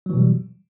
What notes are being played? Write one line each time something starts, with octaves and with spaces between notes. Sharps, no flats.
B2 E3 F#3 G3